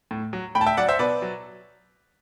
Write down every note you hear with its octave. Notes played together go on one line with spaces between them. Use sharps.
A2
F#3
A2 G5 B5
A5
E5 G5
F#3 D5 F#5
C5 E5
B2 B4 D5
F#3